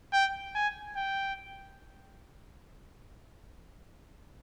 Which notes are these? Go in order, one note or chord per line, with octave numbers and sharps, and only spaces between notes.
G5
G#5
G5